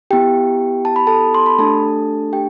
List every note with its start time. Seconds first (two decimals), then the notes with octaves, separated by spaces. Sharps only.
0.11 B3 E4 G4 G5
0.85 A5
0.96 B5
1.07 A4 A5
1.34 C6
1.46 B5
1.58 A3 D4 G4 A4 A5
2.33 G4 G5